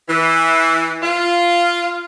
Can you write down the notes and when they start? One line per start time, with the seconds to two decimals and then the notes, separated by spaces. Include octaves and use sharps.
0.09 E3
1.02 F4